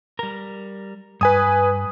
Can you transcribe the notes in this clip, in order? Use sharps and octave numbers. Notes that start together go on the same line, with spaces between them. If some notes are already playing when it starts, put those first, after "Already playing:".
G3 A#4
G2 B4 G#5 D#6